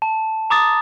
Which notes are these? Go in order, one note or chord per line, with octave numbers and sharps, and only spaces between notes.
A5
A#5 D6 D#6 A6